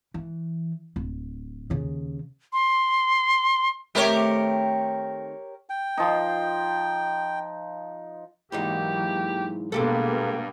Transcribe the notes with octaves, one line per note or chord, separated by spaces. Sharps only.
E3
D1
D#2 C#3
C6
D#3 A3 C4 G4 A#4 C#5
G5
F3 D#4
E2 G#2 E3 F#3 A#3 D#4 G4
G2 B2 G#3 A#3 B3 G4 A4